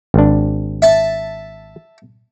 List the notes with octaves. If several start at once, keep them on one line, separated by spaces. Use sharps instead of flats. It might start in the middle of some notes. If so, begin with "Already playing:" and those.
G#1 D4
E5 A5